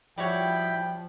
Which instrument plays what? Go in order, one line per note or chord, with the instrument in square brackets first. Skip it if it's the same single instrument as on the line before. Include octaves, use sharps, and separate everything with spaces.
[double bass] F3 [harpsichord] G3 F#4 C#5 [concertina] E4 B5 [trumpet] G5